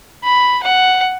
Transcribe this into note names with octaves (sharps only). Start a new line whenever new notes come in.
B5
F#5